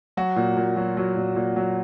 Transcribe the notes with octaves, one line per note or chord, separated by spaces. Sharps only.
F#3 F#4
A#2
A#2
F#3
F#3
A#2
A#2
F#3